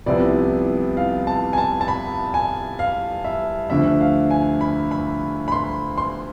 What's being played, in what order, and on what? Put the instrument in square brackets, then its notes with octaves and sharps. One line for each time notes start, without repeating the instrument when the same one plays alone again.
[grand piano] C2 C3 F3 B3 E4 D5
F5
A5
G#5
A5
A5
B5
G#5
F5
E5
D2 D3 F3 E5
F5
G#5
B5
B5
B5
C6
C6